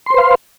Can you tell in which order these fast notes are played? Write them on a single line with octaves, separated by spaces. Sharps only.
C6 C5 B4 F5